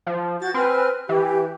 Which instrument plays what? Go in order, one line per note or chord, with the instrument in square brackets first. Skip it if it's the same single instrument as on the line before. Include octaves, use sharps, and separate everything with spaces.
[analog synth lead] F3
[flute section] F#4 G6 [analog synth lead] A6
[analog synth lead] C4 [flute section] B4 G#5 F6
[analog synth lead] E3 [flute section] G4